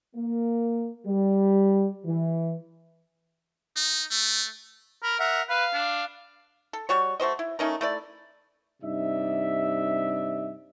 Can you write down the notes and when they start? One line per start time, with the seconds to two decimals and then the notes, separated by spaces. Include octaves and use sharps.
0.15 A#3
1.06 G3
2.05 E3
3.76 D#4
4.11 A3
5.03 A#4 B5
5.20 A#4 E5 F#5
5.50 B4 F5
5.74 D4
6.73 A4
6.89 G3 F#4 C#5
7.20 A3 F#4 C5 D#5
7.39 E4
7.59 A3 C#4 D#4 A#4
7.81 A3 E4 D5
8.83 G2 C3 D#4 D5 E5